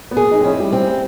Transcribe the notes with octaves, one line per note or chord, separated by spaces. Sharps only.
B3
A#3 G#4
D#4
C4
C#4 E4
G3
C4